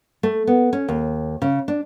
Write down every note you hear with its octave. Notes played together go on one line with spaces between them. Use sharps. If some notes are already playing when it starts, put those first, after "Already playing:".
A3
B3
C#4
D#2
C#3
D4